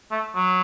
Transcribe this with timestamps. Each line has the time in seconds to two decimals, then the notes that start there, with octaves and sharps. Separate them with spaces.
0.11 A3
0.36 F#3